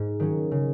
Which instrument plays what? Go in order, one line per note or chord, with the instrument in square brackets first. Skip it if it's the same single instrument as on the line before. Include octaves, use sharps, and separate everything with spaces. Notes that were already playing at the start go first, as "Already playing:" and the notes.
Already playing: [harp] G#2
D#3 F#3 C#4
C#3